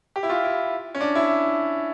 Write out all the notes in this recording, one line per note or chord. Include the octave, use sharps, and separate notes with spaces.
G4
E4
F4
E4
C#4
D4
E4